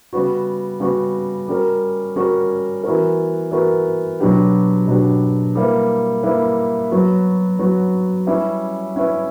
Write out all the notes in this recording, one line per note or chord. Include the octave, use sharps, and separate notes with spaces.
C#3 G3 B3 F#4
C#3 G3 B3 F#4
G3 C#4 F#4 A#4
G3 C#4 F#4 A#4
E3 B3 F#4 A#4
E3 B3 F#4 A#4
B2 F#3 B3 D4 G4
B2 F#3 B3 D4 G4
G3 A#3 E4 B4
G3 A#3 E4 B4
F#3 B3 F#4
F#3 B3 F#4
G3 C#4 E4 B4
G3 C#4 E4 B4